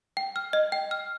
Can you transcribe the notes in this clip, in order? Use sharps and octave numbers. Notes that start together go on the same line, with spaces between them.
G5
F6
D#5
G5
F6